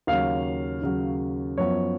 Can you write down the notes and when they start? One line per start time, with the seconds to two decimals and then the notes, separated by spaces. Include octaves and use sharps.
0.07 D#2 C#3 F#3 F5
0.82 D#2 C#3 F#3
1.58 F#2 F3 B3 C#5